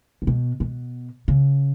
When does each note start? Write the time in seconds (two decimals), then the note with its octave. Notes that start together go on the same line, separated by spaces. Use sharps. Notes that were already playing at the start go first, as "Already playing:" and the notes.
0.22 C#3
0.27 B2
0.60 B2
1.28 C#3